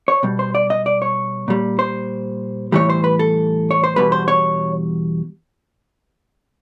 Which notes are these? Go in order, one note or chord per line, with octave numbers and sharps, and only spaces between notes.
C#5
B2 G3
C5
D5
D#5
D5
C#5
A#2 G3
C5
A2 E3 G3 C#5
C5
B4
A4
C#5
C5
E2 B2 G3 B4
C5
C#5